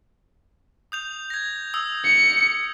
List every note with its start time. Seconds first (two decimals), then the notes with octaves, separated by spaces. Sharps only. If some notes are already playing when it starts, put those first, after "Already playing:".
0.92 D#6 G6 F7
1.30 G#6 A#6
1.74 D#6 E6
2.05 C#7